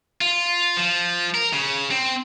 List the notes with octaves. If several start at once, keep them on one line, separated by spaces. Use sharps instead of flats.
F4
F3
A#4
C#3
C4